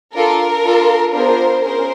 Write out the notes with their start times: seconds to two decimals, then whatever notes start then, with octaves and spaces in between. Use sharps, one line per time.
0.14 D4 F4 A4 A#4
0.64 D4 F4 A4
1.14 B3 D4 F4 G#4 A#4 C5
1.63 C#4 G#4 A#4 C5